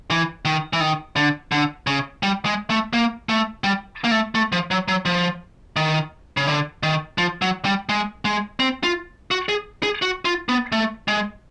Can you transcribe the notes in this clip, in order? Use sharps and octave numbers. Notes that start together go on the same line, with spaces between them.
E3
D#3
E3
D#3
D3
D3
C#3
G3
G#3
A3
A#3
A3
G3
A#3
A3
A3
F3
F#3
F#3
F3
D#3
C#3
D3
D#3
F3
F#3
G3
G#3
G#3
C4
F4
F#4
G#4
G#4
F#4
F4
B3
A3
G#3